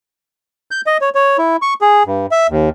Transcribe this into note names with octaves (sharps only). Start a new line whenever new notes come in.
G6
D#5
C#5
C#5
E4
C#6
G#4
G2
E5
D#2